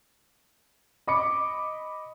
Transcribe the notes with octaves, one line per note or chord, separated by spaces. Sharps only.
D#5 B5 D6 C#7